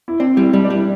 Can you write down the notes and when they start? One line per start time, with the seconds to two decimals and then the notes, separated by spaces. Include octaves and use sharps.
0.08 E4
0.20 C4 D4
0.37 G3 E4
0.53 G3 D4
0.64 D4
0.70 G3 E4